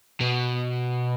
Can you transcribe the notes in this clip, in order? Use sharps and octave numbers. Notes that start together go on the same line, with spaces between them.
B2